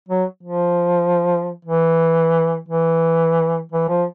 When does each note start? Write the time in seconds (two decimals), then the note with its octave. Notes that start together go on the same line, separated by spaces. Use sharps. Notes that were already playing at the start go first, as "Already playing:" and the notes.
0.08 F#3
0.43 F3
1.65 E3
2.68 E3
3.72 E3
3.88 F3